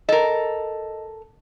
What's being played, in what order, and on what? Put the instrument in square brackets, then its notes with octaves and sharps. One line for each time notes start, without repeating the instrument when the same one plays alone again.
[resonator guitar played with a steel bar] A4 A#4 [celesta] D#5